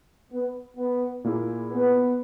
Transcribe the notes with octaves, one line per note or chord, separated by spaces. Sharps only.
B3
B3
A#2 A#3 E4 G#4
B3